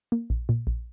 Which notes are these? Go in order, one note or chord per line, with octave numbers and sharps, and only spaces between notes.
A#3
A#1
A#2
A#1